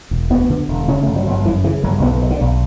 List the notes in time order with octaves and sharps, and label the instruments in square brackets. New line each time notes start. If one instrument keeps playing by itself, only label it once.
[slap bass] E1
D2 B3
D3
E1
C#3 C#4
A3
G1
F#3
G1 F#3
F#2 E3
C#3 E3
G1 F#3
B1 B3
B2
D3
B1